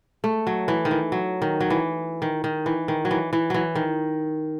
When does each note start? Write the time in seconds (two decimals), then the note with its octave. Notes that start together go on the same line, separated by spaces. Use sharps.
0.24 A3
0.47 F#3
0.68 E3
0.85 D#3
0.91 E3
1.12 F#3
1.42 D#3
1.60 F#3
1.70 E3
2.22 D#3
2.44 D#3
2.66 E3
2.88 D#3
3.05 F#3
3.11 E3
3.33 E3
3.50 E3 F#3
3.75 D#3